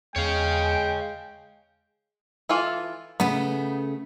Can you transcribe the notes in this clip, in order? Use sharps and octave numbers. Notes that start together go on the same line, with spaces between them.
E2 G#3 C#5 F5 G5
E3 F4 A4
C#3 A3 B3